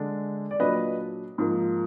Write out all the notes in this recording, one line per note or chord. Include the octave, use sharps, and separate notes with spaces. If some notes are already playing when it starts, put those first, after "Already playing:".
Already playing: D3 G#3 D4
D5
A#2 F#3 D4 B4 D#5
G#2 F3 A#3